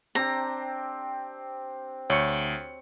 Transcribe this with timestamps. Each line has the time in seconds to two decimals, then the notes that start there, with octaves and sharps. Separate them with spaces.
0.15 C4 D4 G4 A#5
2.10 D2 C#5 C#6 C#7